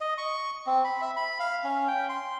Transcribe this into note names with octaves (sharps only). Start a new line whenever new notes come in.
D#5
C#6
C4
B5
E5
B5
F5
C#4
G5
C6